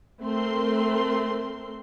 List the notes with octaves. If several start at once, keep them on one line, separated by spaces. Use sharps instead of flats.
A3 C4 A#4 C6